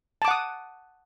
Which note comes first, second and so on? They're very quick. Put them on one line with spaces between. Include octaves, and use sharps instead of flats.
A5 D6 F#5 D#6